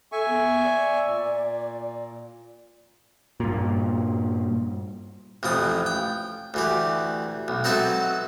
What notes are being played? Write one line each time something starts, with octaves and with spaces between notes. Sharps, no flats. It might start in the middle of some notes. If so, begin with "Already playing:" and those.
A4 E5 G#5 C#6
B3
D5
A#2
G2 A#2
A1 F2 F3 D#6
G5
D2 E3 G4
B1
F#3 C4 D#4 A4 B4 E5